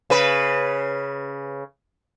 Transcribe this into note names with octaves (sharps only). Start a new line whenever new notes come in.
C#3 B4